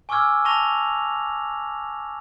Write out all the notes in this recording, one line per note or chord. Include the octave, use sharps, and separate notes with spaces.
G#5 C#6 D6 E6 F6 G#6
A5 C#6 A#6 F7